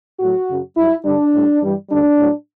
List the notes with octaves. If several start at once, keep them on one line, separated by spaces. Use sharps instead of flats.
A2 F#3 F#4
F#2 C#3 F#3
G2 F#3 E4
G2 D3 G3 D4
A2 G3
G2 E3 G3
D2 D3 G3 D4
A2 F#3